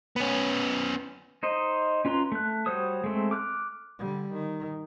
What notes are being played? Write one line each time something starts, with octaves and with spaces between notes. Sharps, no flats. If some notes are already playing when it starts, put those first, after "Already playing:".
B3 C#4
D#4 C5 D#5
C#4 F4 B4 A#5 C6
A3 F#6
G3 F#4 C5 C#5 D#6
G#3 A3 C4
D6 F6 F#6
D3 G3
D#3